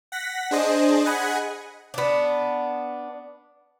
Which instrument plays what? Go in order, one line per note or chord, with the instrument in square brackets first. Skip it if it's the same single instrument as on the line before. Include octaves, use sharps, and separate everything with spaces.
[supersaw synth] F#5 A#6 B6
D4 G#4 C5 D#5
G#4 D#5 F#5 G#5 B5
[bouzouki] B3 D4